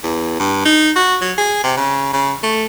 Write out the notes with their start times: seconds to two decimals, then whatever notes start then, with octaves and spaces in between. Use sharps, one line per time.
0.04 E2
0.39 G2
0.65 D#4
0.96 F#4
1.21 F#3
1.38 G#4
1.63 C3
1.77 C#3
2.13 C#3
2.43 A3